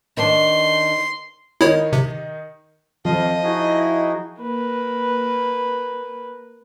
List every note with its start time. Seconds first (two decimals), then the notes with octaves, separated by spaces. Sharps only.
0.17 D#3 D4 C6
1.61 D#3 D#4 E4 C#5
1.93 C3
3.05 F2 F3 D#5 F5
3.44 D#4 E4 F#4 G#4
4.40 A#3 B4